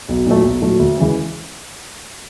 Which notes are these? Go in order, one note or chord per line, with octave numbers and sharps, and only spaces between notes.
B1
A#2 F#3 A3
B1
A#2 F#3 A3
D2
C#3 E3 G#3 C#4